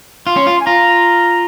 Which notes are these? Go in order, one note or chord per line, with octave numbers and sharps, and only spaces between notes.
F4 C6
C#4
F4
G#5
F4 A#5